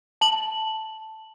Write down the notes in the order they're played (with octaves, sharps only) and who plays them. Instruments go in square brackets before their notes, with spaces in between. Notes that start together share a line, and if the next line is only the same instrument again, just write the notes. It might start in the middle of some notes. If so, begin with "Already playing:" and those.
[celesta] A5 F#7